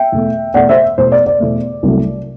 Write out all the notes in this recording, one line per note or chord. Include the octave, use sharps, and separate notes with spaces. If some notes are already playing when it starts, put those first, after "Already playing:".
Already playing: E5 G5
E2 B2 A3
E2 B2 A3 D5 F#5
C5 E5
E2 B2 A3 C5
D5
D5
E2 B2 A3
C2 C3 F#3 A3